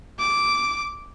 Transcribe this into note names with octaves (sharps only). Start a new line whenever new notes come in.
D6